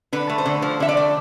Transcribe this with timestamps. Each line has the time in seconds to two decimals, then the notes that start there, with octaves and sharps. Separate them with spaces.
0.13 D3 B4
0.29 A3
0.38 C5
0.45 D3
0.62 F3 C5
0.80 D3 E5
0.89 D5
0.97 A3